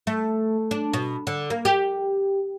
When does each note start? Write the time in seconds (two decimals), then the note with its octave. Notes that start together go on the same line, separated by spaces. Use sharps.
0.07 A3
0.71 D4
0.93 B2
1.27 D3
1.50 A#3
1.65 G4